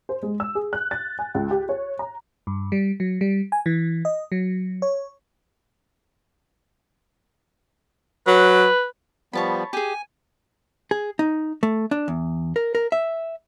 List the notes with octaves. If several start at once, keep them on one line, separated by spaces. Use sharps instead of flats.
C5
G#3
E6
G#4
F#6
A6
G#5
C#2
G4
C#5
A#5
G2
G3
F#3
G3
G#5
E3
D#5
F#3
C#5
F#3 B4
F3 G3 B3 C#5 A5 B5
G4 G#4 G#5
G#4
D#4
A3
D4
E2
A#4
A#4
E5